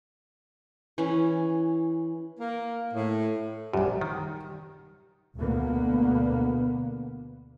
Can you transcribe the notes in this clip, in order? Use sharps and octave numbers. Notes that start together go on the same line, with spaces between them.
E3 C#4
A#3
A2
A#1 F#2 G3
D#3
D2 B2 D3 A#3 B3